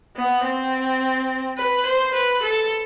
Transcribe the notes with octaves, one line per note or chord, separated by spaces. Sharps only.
B3
C4
B4
C5
B4
A4